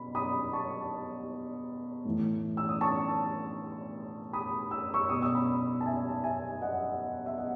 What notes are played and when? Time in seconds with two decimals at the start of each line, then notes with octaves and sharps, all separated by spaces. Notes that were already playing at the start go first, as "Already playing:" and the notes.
Already playing: B2 B5
0.15 B5 D#6
0.53 A5 C#6
2.05 A2 E3
2.57 E6
2.69 D#6
2.81 A5 C#6
4.33 B5 D#6
4.71 E6
4.94 C#6 E6
5.09 B2 D#6
5.22 E6
5.35 B5 D#6
5.81 A5
5.86 E5 G#5
6.24 E5 G#5
6.62 D#5 F#5
7.26 E5
7.38 D#5 F#5